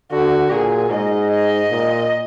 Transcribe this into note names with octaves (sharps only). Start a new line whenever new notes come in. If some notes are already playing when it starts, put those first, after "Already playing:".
D3 F#4
A#2 G#4
G#2 D#5
D#5
A#2